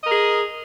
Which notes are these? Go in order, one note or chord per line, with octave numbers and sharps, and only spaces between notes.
G#4 A#4 D#5